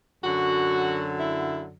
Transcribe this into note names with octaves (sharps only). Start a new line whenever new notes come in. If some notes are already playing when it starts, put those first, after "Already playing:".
F#2 D3 F#3 F#4
E4